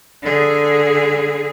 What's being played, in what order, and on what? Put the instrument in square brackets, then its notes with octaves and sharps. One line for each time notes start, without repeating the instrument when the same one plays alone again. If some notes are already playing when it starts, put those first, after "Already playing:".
[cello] D3 G#4